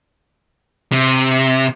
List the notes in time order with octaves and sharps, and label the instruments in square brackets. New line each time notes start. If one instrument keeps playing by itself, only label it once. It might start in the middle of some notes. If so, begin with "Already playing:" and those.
[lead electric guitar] C3